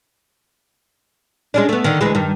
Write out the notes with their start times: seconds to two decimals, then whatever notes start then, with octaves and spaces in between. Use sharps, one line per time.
1.54 G#3 C#4 D4
1.69 A3 B3
1.84 D3 D#3
2.01 D2 E3 G#3
2.15 G2 D#3